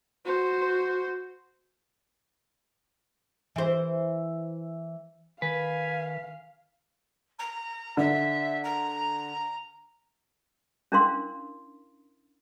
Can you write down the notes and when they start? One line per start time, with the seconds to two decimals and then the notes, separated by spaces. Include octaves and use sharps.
0.25 F#4 C5
3.56 E3 C5
5.42 D#3 B4 F5 G#5
7.39 A#5
7.97 D3 E5
8.63 A#5
10.92 C#4 D4 E4 A#4 F5 C6